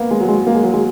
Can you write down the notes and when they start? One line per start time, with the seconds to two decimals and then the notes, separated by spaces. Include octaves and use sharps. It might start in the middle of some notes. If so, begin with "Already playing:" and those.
Already playing: A#3 B3
0.11 G#3
0.21 F#3
0.28 G#3
0.47 A#3
0.55 G#3
0.64 F#3
0.74 G#3